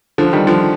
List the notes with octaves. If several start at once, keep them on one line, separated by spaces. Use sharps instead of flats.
D3 F3
D#3 G3
D3 F3